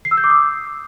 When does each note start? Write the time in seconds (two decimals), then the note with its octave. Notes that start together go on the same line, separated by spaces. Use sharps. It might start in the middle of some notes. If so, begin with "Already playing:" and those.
0.05 C7
0.11 E6
0.17 G6
0.24 D6
0.30 D#6